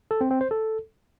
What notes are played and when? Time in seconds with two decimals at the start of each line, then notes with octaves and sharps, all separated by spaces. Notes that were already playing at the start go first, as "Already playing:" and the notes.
0.11 A4
0.21 C4
0.31 C4
0.41 C5
0.51 A4